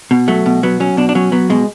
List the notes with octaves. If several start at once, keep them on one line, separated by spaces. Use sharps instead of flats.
B2
F#3 A3
B2
F#3 B3
F#3 C#4
B2 D4
D4
F#3 C#4
F#3 B3
B2 G#3